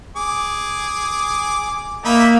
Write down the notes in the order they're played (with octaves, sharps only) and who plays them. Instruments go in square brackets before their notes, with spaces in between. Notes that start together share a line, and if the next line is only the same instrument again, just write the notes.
[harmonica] G#4 D6
[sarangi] A#3 [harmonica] D#4 E5 B5